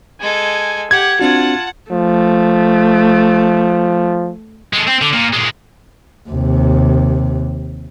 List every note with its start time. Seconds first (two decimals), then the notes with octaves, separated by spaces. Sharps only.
0.20 G#3 A4 G#5
0.91 G4 F#5 G#6
1.19 C4 D4 F4 F#4 F#5 A5
1.91 F3 A3
4.73 G#3 A4
4.88 C4
5.01 D3
5.13 A#2
5.33 A#2 G#3
6.29 D#2 C3